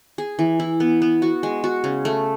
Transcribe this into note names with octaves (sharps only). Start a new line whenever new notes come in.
G#4
E3
E4
B3
B3
F#4
G#3
F#4
C#3
A3